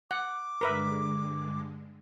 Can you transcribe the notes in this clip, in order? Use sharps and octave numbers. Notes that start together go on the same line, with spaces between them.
F#5 D6
G2 D3 G#3 A#4 B4 E5